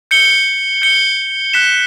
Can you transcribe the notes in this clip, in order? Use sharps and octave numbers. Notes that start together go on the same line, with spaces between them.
G6 C#7 G7
G6 C#7 G7
F#6 B6 E7